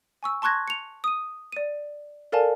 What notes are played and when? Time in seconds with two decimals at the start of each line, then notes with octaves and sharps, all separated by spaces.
0.23 G#5 C#6 E6
0.42 A5 C6 C#6 F#6 G#6 A#6
0.68 C#7 F7
1.04 D#6 D#7
1.52 D5 D#7
2.32 A4 A#4 D5 F5 G#5 A5